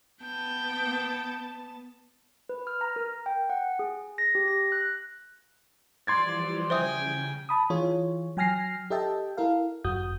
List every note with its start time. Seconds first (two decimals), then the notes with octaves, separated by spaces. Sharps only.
0.22 B3 G5 A5
2.49 B4
2.67 F6
2.81 A#5
2.96 A#4
3.26 G5
3.50 F#5
3.79 G#4
4.18 A#6
4.35 G4
4.48 A#6
4.72 F#6
6.07 E3 F3 G3 D5 C6 G#6 A6
6.70 C#3 C5 E5 G5 G#5 D#6
7.49 A5 B5 D#6
7.70 E3 F4 G#4 C#5
8.37 F#3 G5 G#5 F6 A#6 C7
8.90 G4 A4 D#5 E5 G5 A5
9.37 E4 A4 A#4 F5
9.84 G1 F#2 F#4 D#6 G6